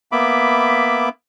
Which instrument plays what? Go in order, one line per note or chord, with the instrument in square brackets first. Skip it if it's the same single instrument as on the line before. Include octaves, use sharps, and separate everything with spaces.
[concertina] A#3 B3 E5 B5 D6